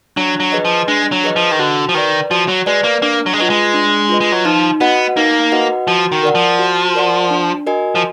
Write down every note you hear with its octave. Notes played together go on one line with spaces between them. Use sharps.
F#3 D4
F#3
G#4 B4 D#5
F3
G#3 D4
F#3
G#4 B4 D#5
F3
D#3
D3 F#4
F3
D#3 B4 D5
F3 F#4
F#3
G#3 B4 D5
A#3
A#3 D4
F#3
G#3
F#3 F4 B4 D#5
G#3
D4
F4 B4 D#5
G#3
F#3
F3 D#4
B3 F#4 B4 D#5 F#5
A#3 D#4
F#4 B4 D#5 F#5
F3 F#4
D#3
A#4 D5 F#5
F3
F#4
A#4 D5 F#5
D4
F#4 A#4 D#5 G#5
F3